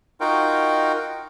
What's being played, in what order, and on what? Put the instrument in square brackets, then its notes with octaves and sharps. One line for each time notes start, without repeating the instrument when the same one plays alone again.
[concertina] D#4 F4 F#4 A#4 G5